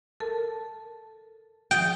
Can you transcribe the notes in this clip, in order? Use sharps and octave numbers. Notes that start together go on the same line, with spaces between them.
A4 A#4 A5
F3 G5 D#6